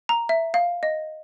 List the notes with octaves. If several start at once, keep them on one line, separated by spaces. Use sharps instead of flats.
A#5
E5
F5
D#5